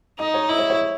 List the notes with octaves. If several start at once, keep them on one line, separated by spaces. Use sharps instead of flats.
D#4 D#5
C#5
E4 D#5
C#5
C#5